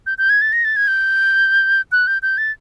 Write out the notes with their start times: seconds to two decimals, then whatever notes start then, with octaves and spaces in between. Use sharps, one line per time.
0.07 G6
0.18 G6
0.30 G#6
0.41 A6
0.53 A#6
0.65 A6
0.76 G#6
0.88 G6
1.92 F#6
2.07 G6
2.22 G6
2.38 A6